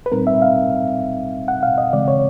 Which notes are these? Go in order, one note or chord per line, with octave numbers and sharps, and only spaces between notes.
B4
A#2 G3 C4 D#4 A#4
E5
F5
F#5
F5
D#5
C#3 E3 G#3 C4 D5
C#5